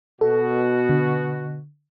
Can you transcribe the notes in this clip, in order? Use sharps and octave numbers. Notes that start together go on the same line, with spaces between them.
B2 F#4 A4
D3